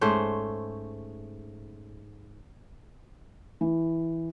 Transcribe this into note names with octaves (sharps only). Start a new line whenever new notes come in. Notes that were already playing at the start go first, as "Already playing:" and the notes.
G#2 A3 C#4 C5
E3